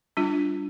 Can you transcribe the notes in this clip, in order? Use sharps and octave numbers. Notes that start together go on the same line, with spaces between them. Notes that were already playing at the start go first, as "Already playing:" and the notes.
G3 D4 F4